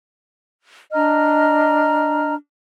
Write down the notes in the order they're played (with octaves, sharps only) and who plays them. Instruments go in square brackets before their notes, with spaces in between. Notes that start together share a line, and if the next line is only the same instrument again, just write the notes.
[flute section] D4 D#5 A#5 F6